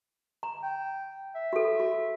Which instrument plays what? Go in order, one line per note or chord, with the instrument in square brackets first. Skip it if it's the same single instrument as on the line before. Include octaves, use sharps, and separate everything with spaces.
[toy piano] A#5
[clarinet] G5
E5
[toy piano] F#4 A4
F#4